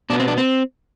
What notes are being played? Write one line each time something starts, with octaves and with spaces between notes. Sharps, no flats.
B2 B3 D4
C4
D4
C4